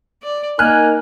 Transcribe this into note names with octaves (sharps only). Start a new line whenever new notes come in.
D5
A#3 D#4 A#4 G#5 F6 F#6